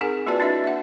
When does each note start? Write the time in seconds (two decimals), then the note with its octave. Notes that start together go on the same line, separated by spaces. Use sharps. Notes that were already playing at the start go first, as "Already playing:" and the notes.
0.01 C4 D#4 G#4 A#4 G#5
0.26 A#3 F4 F#4 B4 D5 A5
0.40 D4 E4 F#4 B4 D#5 E5
0.64 E5 F#5